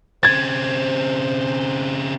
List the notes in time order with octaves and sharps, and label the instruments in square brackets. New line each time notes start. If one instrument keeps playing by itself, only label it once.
[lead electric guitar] C#3 C4 [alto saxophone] C5 [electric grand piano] G#6 A6